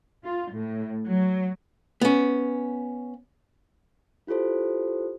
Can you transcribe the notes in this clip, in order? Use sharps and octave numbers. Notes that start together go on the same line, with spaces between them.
F4
A2
F#3
B3 C#4
E4 F4 G4 A4 C5